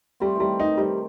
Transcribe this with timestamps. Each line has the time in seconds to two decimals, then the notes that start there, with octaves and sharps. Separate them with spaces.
0.20 G3 A3 C4
0.35 D#3 E3 G3
0.60 D#4
0.77 C3 G3